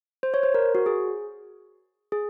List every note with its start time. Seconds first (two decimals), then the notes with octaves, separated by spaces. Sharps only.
0.23 C5
0.34 C#5
0.43 C5
0.54 A#4
0.75 F#4
0.86 G#4
2.12 G#4